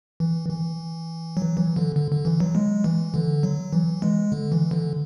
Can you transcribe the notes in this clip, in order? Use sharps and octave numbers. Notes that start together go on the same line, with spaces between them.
E3
E3
F#3
E3
D3
D3
D3
E3
F#3
G#3
E3
D3
F#3
E3
G#3
D3
E3
D3